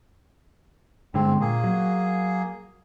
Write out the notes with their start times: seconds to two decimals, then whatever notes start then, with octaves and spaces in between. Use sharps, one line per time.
1.14 G2 D3 G#3 C4
1.41 A#2 A#3 G#4
1.64 F#3